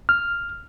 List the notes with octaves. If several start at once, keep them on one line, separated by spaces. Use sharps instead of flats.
F6